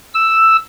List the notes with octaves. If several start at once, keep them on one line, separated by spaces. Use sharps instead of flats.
E6